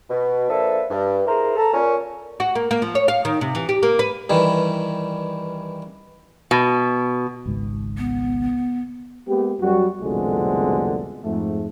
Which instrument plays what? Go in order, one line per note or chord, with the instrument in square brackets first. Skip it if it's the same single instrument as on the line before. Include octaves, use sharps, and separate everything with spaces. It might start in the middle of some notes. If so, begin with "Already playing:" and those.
[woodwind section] B2
F3 A#3 D4 A4 B4 E5
G2
E4 G#4 A#4 C5 A#5
A4 A5 A#5
A#2 C#4
[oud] F#4
A#3
A#3
F3
C#5
F5
D#3
C3
E3
G4
A#3
B4
[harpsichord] G2 D#3 E3
[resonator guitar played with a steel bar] B2
[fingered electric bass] G#1 C#2 G#2
[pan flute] B3
[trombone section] G#3 A#3 B3 G4
F#2 G3 F#4
C2 F2 B2 D3 G#3 A3
F2 G#2 A3